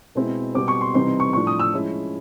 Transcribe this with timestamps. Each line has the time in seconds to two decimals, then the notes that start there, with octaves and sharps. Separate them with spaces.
0.15 B2 G#3 C4 E4
0.54 B2 G3 C4 D6
0.68 C#6
0.81 C6
0.94 C3 E3 G3 C4 D#4 C6
1.20 C#6
1.33 A2 F3 A3 D4 C#6
1.47 D#6
1.59 E6
1.74 F3 G#3 C#4 E4